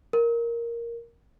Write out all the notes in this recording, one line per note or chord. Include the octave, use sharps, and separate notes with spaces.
A#4